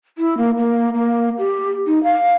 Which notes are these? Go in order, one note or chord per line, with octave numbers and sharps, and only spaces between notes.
E4
A#3
A#3
A#3
G4
D#4
F5